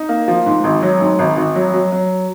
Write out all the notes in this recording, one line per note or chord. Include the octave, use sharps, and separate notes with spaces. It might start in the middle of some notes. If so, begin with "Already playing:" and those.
Already playing: D#4
A#3
F3
G#2
G#1
F#3
G#2
G#1
G#1
F#3
F#3
F#3